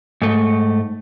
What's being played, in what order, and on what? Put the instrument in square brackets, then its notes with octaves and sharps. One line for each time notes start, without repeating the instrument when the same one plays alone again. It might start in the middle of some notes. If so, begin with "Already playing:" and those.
[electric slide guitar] G#2 A3